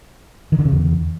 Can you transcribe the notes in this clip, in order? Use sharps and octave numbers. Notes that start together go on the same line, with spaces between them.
D#3
D3
C#3
E2